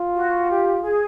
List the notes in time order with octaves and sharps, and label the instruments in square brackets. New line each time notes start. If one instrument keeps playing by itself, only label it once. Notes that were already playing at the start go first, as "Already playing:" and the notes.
Already playing: [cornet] F4
[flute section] F#4
G4
G#4